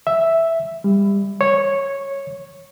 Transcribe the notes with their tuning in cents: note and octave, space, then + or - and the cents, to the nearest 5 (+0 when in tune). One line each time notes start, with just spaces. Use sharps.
E5 +0
G3 +30
C#5 -10